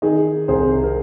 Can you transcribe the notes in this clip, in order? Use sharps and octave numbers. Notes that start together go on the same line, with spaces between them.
D#3 D#4 G#4
C2 G#4 C5
A#4